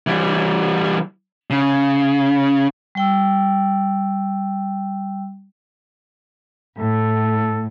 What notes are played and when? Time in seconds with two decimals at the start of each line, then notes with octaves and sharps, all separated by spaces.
0.07 E3 G3
1.50 C#3
2.95 G3 G5 E6
6.78 A2 A4